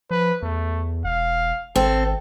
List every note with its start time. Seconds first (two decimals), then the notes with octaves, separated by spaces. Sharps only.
0.11 F3 B4
0.42 E2 A3
1.04 E1 F5
1.76 G#1 C4 A4